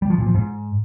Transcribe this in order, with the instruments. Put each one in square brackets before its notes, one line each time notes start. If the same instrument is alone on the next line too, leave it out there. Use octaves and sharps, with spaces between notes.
[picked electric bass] G3
F3
A#2
F3
G#2